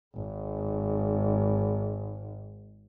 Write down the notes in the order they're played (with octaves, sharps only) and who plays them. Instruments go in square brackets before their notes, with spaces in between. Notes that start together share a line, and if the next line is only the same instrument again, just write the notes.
[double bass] G#1 G#2